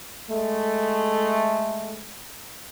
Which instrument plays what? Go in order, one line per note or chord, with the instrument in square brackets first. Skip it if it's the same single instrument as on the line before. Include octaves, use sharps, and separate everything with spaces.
[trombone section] G#3 A3